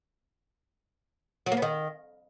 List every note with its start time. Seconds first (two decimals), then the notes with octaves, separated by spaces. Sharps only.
1.46 F#3
1.52 A#3
1.57 B3
1.62 D#3